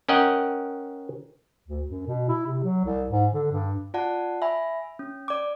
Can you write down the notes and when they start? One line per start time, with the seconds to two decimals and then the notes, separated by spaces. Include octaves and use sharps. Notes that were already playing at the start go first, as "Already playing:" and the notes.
0.09 C#4 A#4 D#5 F#5 G5
1.68 D2
1.89 F#2
2.07 B2
2.29 E4
2.47 C3
2.63 F#3
2.85 C2
3.09 G#2
3.33 D3
3.51 G2
3.94 F4 D5 F#5 A5
4.42 E5 G#5 B5
4.99 C#4
5.28 D5 D6